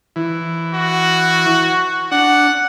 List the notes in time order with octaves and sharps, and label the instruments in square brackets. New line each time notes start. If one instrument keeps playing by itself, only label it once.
[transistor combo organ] E3
[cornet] F#4
[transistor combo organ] D4 [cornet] F#5